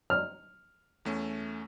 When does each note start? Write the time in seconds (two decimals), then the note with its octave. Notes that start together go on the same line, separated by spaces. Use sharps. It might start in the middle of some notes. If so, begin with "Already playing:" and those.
0.10 F6
1.05 E2 A3 C#4